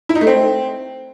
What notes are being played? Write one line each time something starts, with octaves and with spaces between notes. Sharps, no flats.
E4
D#4
A3
C4